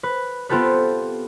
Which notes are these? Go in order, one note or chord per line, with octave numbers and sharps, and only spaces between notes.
B4
B3 C4 F4 G4 A4 B4